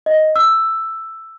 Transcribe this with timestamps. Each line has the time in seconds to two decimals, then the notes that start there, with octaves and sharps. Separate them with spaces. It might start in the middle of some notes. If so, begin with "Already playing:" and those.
0.06 D#5
0.36 E6